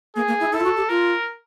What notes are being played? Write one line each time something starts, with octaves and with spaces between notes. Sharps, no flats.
A#3 G#4
A#3
E4
E4 A4
F4
F#4
G4
F4 A#4